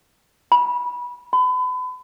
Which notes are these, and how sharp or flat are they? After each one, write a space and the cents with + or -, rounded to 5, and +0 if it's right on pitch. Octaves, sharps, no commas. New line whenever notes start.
B5 -20
B5 +35